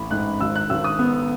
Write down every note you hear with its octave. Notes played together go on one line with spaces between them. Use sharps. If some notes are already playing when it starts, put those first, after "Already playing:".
Already playing: A1 B5
G#2 F#6
G#1 E6
F#6
G#1 E6
D#6
B3